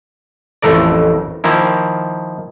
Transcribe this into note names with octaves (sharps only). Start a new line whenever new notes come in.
A1 F2 A2 A3 A#4 D5
D#3 F3 A#3 E4